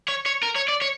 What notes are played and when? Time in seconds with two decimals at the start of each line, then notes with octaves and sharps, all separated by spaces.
0.08 C#5
0.26 C#5
0.43 A#4
0.56 C#5
0.68 D5
0.82 C#5